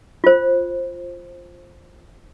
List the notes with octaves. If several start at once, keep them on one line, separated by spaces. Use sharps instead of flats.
F4 C5